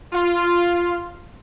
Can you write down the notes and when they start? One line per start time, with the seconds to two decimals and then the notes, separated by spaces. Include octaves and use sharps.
0.13 F4